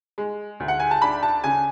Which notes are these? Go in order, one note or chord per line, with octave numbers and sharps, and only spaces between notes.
G#3
D2
F#5
G#5
A5
D4 B5
A5
C#3 G#5